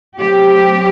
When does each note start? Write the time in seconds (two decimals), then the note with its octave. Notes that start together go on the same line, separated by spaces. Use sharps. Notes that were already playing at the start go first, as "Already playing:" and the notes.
0.19 F#3 A3 C4 G4